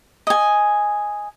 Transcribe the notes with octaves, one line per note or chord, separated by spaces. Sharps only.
D#5 G#5